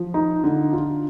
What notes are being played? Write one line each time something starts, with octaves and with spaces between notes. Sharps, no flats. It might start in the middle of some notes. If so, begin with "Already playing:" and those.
Already playing: F3
D#4
D3
F4